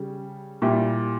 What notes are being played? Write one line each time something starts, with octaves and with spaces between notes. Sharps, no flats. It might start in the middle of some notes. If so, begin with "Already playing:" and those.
Already playing: C#3 G3
A#2 G3 E4